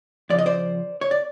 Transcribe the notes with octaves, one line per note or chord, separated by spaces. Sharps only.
F2 C#3 F3 D5
D#5
C5 D5
C#5
D5